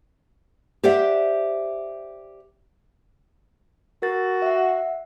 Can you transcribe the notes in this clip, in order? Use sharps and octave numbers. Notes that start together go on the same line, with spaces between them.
G4 C5 D5 E5 F#5
F#4 A#4 A6
E5 F#5